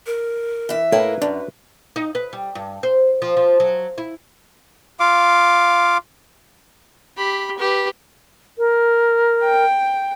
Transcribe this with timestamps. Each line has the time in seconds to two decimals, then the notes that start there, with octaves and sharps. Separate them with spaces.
0.06 A#4
0.69 E3 E5
0.92 A2 A#3 E4 A#4 B4
1.22 F#2 D4
1.96 D#4
2.15 B4
2.33 G3
2.55 G2
2.83 C5
3.22 F3
3.37 F3
3.60 F#3
3.98 E4
5.00 F4 F5 D6
7.17 G4 B5
7.59 G4 B4
8.58 A#4
9.44 G5